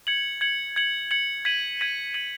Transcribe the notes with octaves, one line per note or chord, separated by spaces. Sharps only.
G#6 C#7 F#7
G#6 C#7 F#7
G#6 C#7 F#7
G#6 C#7 F#7
G#6 B6 D#7 F#7
G#6 B6 D#7 F#7
G#6 B6 D#7 F#7